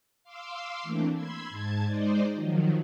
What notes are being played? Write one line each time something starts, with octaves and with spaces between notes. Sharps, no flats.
F5 C6 D6 E6
E3 A3 A#3 C4 D4
B5 C6 E6 G#6
G#2 A5 G#6
G#3 D#4 C5 D5 D#5
D#3 F3 F#3